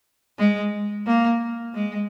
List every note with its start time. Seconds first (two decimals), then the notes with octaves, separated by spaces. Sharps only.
0.38 G#3
1.07 A#3
1.74 G#3